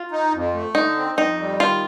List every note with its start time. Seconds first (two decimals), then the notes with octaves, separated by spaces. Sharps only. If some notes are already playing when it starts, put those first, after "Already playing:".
Already playing: F4
0.11 D#4
0.33 F2
0.54 A3
0.75 D3 D#4
0.97 C4
1.18 F2 D#4
1.40 G3
1.60 D#3 F4